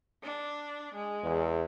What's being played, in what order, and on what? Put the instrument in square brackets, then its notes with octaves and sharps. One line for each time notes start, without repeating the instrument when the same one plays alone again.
[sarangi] D4
G#3
[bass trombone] E2